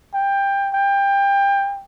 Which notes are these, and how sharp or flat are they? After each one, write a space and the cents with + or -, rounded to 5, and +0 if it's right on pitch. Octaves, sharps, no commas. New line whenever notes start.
G5 +20
G5 +25